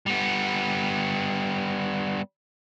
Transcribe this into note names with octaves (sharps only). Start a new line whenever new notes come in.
G3 B3